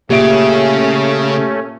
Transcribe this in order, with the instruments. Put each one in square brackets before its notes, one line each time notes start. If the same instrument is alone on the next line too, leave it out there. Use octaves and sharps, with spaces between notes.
[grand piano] A#2 D7 [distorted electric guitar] C#3 [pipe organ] A3 C#4 [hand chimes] G4 E5